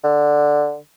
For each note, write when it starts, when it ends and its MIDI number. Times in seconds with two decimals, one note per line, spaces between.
0.04 0.77 50